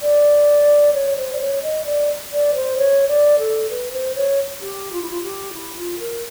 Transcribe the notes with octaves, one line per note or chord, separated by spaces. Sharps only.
D5
C#5
C5
D5
C#5
D#5
D5
D5
C5
C#5
D5
A4
B4
C5
C#5
G4
F4
E4
F4
G4
E4
F4
A#4